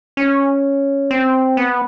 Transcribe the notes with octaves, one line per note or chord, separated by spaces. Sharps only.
C#4
C4
B3